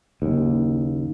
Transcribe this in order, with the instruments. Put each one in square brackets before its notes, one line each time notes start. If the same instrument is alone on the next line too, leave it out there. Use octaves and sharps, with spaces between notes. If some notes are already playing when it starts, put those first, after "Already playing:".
[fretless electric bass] F#1 D#2